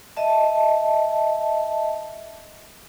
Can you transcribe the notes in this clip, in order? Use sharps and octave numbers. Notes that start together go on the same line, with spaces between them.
D#5 E5 A5